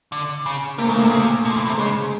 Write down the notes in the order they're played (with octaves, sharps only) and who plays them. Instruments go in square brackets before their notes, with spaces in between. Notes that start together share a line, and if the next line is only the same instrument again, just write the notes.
[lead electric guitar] D3
C#3
[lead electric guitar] C3 [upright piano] A#3
[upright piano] A3
[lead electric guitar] C#3
[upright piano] A#3
[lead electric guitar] C3 [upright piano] A3
[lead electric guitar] C#3
C3
B2
F3
E3
C3
[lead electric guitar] C#3 [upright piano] G#3